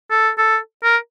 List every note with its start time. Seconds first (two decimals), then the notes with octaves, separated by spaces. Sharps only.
0.11 A4
0.38 A4
0.84 A#4